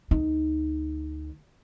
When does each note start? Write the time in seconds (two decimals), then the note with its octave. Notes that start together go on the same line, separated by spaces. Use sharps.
0.11 D2 D#4